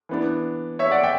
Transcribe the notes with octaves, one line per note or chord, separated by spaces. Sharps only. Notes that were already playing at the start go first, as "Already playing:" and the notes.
E3 B3 D4
C#5 E5
D5 F#5
E5 G5